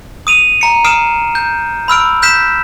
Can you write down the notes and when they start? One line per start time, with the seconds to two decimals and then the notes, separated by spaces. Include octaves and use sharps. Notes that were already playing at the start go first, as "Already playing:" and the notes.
0.27 D#6 D#7 F7
0.61 A#5 C#7
0.85 D#6 F6 C7 D7 E7
1.35 G6
1.88 B5 E6 F6 D7
2.22 F6 G6 B6 E7